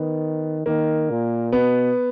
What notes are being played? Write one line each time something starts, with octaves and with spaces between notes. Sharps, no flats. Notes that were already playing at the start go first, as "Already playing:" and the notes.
Already playing: D#3 B3
D#3 A#3
A#2
B2 B3